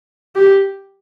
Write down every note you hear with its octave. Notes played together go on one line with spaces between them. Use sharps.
G4